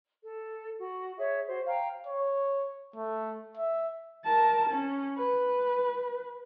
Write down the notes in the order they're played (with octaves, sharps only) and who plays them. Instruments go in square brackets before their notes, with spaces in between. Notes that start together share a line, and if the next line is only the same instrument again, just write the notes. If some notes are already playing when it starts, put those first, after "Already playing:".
[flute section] A4
F#4
G#4 C#5 E5
F#4 C5
F5 G5 A#5
[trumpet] C#5
A3
E5
[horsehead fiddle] A#4 A5
C#4
B4